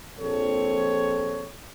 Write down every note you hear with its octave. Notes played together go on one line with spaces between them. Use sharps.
A#1 C4 A4 C#5